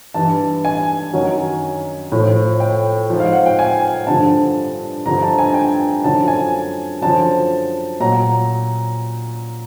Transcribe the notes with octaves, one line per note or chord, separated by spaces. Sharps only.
G2 E3 A5
G#5
F#2 D#3 F#3
A2 F3
G5
G#2 F3
F5
F#5
G5
G#5
G2 D3 F3 A5
G2 D3 F3 A#5
A5
G#5
G5
G#5
F#2 D3 F3 A5
G#5
F#2 D3 F3 A5
A#2 F#3 A#5